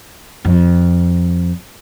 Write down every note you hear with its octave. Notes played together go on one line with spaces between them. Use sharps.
F2